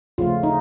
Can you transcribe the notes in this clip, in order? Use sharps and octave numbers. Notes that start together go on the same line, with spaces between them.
C#3 F3 A3 F4
D#4